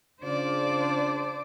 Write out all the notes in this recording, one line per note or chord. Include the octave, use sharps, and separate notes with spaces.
C#3 D4 F4 C5 D5